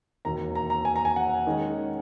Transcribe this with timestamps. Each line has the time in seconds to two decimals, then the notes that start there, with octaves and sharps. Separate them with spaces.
0.25 E1 D#2 D#3 A#3 A#5
0.55 A#5
0.70 A#5
0.85 G#5
0.96 A#5
1.05 G#5
1.16 F#5
1.47 D#3 G#3 C#4